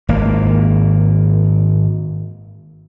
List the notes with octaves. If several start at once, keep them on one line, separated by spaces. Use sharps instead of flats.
G#1 A#3